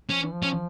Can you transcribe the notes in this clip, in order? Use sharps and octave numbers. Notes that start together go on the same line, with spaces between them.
F3 C#4
E3
F3
C#4